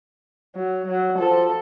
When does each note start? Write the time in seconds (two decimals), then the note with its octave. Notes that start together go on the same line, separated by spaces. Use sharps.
0.56 F#3
0.88 F#3
1.19 F3 A4